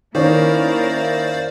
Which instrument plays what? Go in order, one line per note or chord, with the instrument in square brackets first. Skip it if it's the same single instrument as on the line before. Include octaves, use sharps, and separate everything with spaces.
[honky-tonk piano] D#3 C#4 [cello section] A#3 E4 A#4 [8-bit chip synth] C5 D5 F5